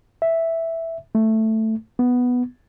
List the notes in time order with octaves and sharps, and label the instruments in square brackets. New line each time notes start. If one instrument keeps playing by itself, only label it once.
[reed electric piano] E5
A3
B3